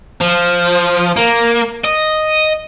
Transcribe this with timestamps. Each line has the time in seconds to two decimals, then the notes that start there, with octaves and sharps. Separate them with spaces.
0.21 F3
1.16 A#3
1.85 D#5